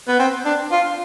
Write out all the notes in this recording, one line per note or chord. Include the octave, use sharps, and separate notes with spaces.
B3
C4
D4
F4